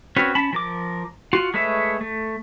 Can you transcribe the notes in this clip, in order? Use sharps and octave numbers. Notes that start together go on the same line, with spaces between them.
C4 C#4 F#4 B4 C#5
C#4 A5 B5
F3 A#4 D6
F4 F#4
G#3 A3 B4 C#5 E5
A3